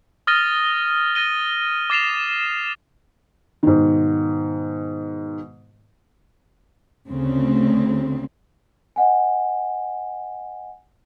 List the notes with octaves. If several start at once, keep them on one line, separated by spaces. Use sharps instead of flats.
D#6 F6 A6 A#6 D#7 G7
A6 A#6 D#7 G7
D6 A6 C7 E7 F7
G#2 B2 D#3
D2 C#3 C4
D#5 F#5 G#5